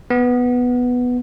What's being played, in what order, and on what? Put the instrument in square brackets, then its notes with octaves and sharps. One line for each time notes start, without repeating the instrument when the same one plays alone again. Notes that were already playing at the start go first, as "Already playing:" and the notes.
[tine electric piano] B3